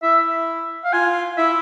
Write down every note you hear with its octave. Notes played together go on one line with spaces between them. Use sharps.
E4 E5
F5
F4 G#5
E4 E5